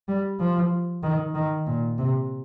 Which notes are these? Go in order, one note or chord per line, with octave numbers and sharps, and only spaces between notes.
G3
F3
D#3
D#3
A#2
C3